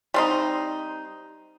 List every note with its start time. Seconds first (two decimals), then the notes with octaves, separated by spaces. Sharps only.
0.14 G3 C4 D#4